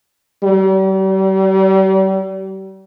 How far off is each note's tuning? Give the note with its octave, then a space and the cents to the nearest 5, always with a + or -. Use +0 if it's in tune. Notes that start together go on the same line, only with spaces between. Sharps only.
G3 -40